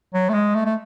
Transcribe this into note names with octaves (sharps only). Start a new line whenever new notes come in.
F#3
A3
G#3
A3
A3